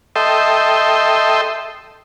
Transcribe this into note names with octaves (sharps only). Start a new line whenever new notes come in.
A4 D#5 E5 G5 C6